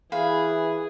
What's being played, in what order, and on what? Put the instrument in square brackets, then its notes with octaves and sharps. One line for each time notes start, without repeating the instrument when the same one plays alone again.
[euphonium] E3 [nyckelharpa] G#4 [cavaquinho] B4 F5